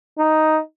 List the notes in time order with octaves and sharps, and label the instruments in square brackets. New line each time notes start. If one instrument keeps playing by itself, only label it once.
[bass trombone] D#4